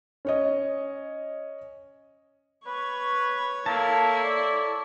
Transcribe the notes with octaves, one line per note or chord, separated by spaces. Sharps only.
C#4 C#5 D#5
B4 C#5 C#6
A#3 E4 A4 A5
D5